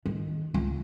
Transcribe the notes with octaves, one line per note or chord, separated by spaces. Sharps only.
D#3
C#2